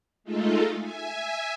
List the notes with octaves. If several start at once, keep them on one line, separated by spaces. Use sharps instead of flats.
G#3 A3 D#4 F4 A4
E5 G#5